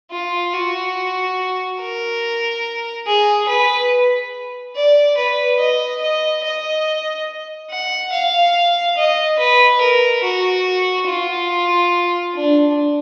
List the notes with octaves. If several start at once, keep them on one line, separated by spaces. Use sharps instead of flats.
F4
F#4
A#4
G#4
B4
D5
B4
D#5
D#5
D#5
F#5
F5
D#5
B4
A#4
F#4
F4
D4